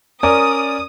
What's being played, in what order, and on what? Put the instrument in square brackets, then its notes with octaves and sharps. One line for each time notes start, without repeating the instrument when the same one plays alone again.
[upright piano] C#4 A#4 D5 [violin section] D#6